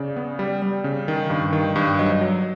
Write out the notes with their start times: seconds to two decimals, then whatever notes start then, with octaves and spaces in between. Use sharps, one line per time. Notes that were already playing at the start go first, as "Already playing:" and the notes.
Already playing: C#3 D5
0.16 B3
0.39 G3
0.62 G3
0.84 C#3
1.08 D#3
1.30 G2
1.53 D#3
1.76 G2
1.99 F#3 D#5
2.21 F#3